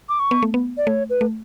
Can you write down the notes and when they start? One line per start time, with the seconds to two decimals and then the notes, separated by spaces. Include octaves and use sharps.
0.09 D6
0.19 C#6
0.31 B3
0.43 A3
0.54 B3
0.77 D5
0.87 A3 C#5
1.10 B4
1.21 A3